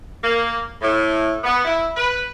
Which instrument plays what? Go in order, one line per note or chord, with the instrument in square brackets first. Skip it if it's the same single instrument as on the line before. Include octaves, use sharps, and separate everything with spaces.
[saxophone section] A#3
A2
B3
E4
B4